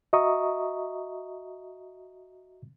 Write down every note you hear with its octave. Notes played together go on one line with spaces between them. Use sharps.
F#4 D#5 E5 A#5 C#6 D#6